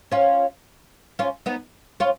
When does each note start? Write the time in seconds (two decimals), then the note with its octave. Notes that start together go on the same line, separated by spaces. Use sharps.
0.11 C#4 F4
1.19 C#4 F4
1.46 B3 D#4
2.00 C#4 F4